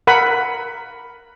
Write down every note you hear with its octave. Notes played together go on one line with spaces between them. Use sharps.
A#4 F#5 B5